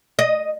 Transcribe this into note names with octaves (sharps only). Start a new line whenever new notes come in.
D#5